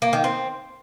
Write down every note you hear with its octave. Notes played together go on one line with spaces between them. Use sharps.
A#3
D#3
C4